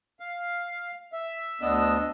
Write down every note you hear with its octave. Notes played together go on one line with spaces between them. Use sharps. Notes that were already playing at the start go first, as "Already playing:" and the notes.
F5
E5
D2 B3 D4 D#5 E6